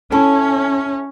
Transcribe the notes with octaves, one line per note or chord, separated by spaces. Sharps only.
C#4 E4 A4